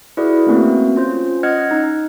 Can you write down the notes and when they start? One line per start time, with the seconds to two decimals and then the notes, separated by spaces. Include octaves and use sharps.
0.17 E4 F#4 G#4 B4 D5
0.47 A3 A#3 C4 C#4 F#4 B4
0.96 C#4 F4 C5
1.43 C#4 D#5 F#5 F6 F#6 G#6
1.71 D#4